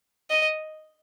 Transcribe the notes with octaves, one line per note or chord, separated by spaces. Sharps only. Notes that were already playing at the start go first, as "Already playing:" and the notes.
D#5